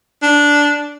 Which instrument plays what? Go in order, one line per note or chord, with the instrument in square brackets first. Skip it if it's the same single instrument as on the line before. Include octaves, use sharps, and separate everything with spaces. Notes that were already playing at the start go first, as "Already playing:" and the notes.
[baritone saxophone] D4